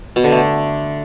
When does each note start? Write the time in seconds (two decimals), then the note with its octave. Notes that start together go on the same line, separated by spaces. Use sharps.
0.16 B2
0.24 D3
0.32 A3